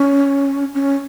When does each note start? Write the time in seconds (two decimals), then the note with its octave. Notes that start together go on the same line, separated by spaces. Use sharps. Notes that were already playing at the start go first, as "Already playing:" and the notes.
Already playing: C#4
0.74 C#4